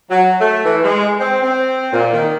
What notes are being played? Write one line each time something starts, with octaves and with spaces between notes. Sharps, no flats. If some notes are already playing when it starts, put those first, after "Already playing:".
F#3
A3
E3
G#3
C4
C4
A#2
D#3